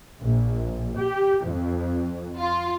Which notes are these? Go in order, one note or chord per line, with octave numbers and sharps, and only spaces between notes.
A#1
G4
F2
F4